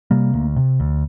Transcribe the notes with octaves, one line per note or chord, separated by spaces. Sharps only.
C3 G3 A#3
D2
C3
D2